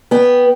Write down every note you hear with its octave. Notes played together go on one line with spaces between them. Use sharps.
B3 G5